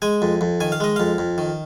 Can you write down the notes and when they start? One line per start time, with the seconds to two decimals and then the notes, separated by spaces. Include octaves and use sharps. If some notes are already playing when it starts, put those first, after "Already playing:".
0.02 G#3 G#5
0.22 F2
0.41 F2
0.60 D#3 G#5
0.72 F5
0.80 G#3 D#5
0.96 F2 F5
1.18 F2
1.38 D#3